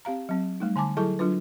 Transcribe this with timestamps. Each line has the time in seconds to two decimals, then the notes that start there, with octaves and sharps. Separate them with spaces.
0.05 C4 G4 F5 A#5
0.29 F#3 C4
0.60 G3 A3 D#4
0.76 D3 G#5 A5 D6
0.97 F#3 E4 G#4 A4 A5 C#6
1.19 F#3 D4 F4 B4